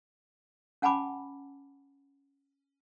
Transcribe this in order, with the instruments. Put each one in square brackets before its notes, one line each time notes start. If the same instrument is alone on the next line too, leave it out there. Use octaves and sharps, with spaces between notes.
[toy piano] C#4 F#5 G#5 A5 B5 D6